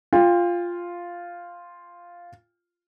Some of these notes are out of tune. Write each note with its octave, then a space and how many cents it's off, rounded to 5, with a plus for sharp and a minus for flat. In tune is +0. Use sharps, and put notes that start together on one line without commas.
F4 +0 G5 +30